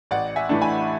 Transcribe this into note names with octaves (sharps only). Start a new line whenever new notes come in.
A1 D5 F#5
E5 G#5
A2 E3 A3 D4
G#5 B5